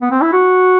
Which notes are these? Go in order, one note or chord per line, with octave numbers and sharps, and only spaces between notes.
B3
C4
E4
F#4